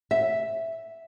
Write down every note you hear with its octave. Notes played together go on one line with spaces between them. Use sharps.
E5